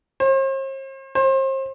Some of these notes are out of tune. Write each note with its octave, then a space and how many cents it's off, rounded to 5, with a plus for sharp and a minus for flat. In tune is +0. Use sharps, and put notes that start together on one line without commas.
C5 +45
C5 +35